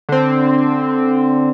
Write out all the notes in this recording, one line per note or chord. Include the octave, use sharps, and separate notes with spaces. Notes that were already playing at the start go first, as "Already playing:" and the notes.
D3 C4